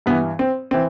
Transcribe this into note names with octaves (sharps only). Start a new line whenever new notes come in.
G2 E3 B3
C4
E3 C4